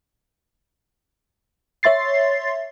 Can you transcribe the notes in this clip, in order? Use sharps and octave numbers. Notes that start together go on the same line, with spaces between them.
C#5 E5 C6 A6 C7